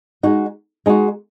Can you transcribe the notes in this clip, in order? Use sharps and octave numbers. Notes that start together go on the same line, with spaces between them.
G#3 D#4 F#4
G#3 D#4 F#4